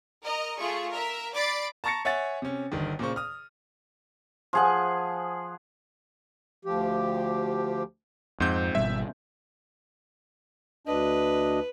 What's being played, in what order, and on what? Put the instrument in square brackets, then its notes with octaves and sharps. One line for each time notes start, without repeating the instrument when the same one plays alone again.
[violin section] A#4 D#5 A#5
A3 F4 G#4 C#6
A#4 E5
D5 B5 D6 A6 C7 D7
[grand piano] A5 A#5 C#6 A6 A#6 C#7
C#5 E5 F#5 G#5 A6
C3 C#4
G1 D3 D#3
A#2 C#3 C5 C#6
D#6 F6
[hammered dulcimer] F3 G#4 F#5
[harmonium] D2 F3 G4
[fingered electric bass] F2 [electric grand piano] G#2 C4 G6
[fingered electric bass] G#1 B2 G3 [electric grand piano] E5
[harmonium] D2 D4 D#5 [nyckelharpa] B4